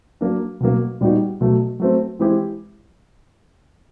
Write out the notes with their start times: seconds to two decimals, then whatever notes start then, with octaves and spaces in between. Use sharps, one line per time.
0.21 F#3 A#3 D4
0.60 B2 F#3 A#3
1.01 A#2 G3 B3 D#4 F#4
1.41 B2 F#3 A3
1.80 F#3 A3 C4
2.19 E3 G#3 C4 E4 G4